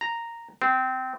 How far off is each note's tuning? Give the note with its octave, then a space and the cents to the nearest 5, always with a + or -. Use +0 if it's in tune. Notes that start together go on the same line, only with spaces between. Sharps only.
A#5 -5
C4 -20